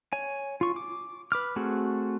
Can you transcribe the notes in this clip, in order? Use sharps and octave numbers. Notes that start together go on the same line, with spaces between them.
C#5 G#5
F4 C#6
D6
B4 D6 F6
A3 C4 F#4 G#4